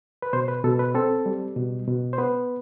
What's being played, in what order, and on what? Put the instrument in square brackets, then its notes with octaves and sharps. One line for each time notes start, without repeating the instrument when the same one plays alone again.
[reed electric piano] B4
B2 C5
B4
B2 A4
B4
C4 A4
G3
B2
B2
C5
B3 B4